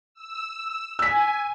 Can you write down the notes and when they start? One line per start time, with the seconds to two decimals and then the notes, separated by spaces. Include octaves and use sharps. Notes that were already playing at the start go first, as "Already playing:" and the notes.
0.14 E6
0.99 G#5 E6 B6